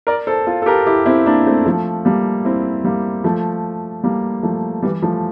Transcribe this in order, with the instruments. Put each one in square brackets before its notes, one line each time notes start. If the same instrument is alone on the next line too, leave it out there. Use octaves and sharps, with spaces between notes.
[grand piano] A#4 D5
A4 C5
F4 A4
A4
G4 A#4
E4 G4
C4 E4
A#3 D4
A3 C4
F3 A3
G3 A#3
C4 E4
G3 A#3
F3 A3
G3 A#3
F3 A3
E3 G3
F3 A3